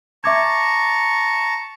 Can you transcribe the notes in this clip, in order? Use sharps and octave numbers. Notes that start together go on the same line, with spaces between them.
E5 A5 A#5 C#6 D6 G#6